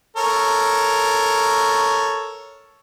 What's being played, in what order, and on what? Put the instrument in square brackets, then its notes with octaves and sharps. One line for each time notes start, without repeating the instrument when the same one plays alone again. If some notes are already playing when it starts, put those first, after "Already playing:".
[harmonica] A4 A#4 C#5